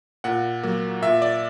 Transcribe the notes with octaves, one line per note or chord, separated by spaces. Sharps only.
A#2 F#5
F#3 A#3
A#2 E5
D5